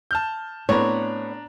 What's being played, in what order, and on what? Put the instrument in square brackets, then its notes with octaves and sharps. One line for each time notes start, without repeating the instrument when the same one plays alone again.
[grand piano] A5 F6 G6
[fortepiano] A2 B3 C4 [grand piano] D4 A#5 [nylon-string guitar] C#5